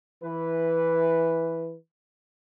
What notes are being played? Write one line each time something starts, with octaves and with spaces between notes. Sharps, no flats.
E3 B4